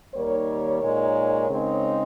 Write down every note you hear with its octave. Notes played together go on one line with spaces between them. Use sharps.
D#2 D#3 G3 A#3 A#4 C#5
A#2 G#3 D#4
C#3 G#3 C4 D#4